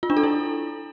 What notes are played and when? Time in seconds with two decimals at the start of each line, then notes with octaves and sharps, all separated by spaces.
0.03 F4
0.10 D4
0.17 A4
0.23 E4